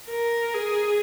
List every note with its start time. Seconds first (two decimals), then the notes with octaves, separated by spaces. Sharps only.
0.09 A#4
0.54 G#4